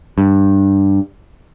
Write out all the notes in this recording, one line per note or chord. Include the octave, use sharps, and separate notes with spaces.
G2